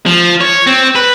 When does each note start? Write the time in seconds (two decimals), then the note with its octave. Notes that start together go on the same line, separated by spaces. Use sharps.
0.06 F3
0.41 C#5
0.67 C4
0.95 B4